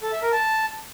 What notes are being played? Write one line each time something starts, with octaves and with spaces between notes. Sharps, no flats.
A4
E5
A#4
A5